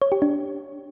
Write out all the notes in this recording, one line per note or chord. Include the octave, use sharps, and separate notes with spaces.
C#5
G4
D4